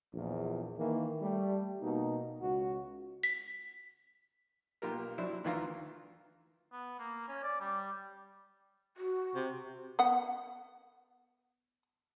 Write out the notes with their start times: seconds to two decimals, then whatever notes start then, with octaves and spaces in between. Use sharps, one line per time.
0.14 A#1 E2
0.78 D#3 E3 A#3
1.20 G3 A3
1.82 B2 A#3 D#4
2.40 C#2 F#4
3.23 B6
4.82 B1 A#3 F4 G4 A#4
5.18 F#3 D4 E4 C5
5.44 D2 D#3 E3 F4 F5 A#5
6.72 B3
6.99 A#3
7.28 C#4
7.43 D5
7.61 G3
8.97 F#4
9.35 C3
9.99 B3 F#5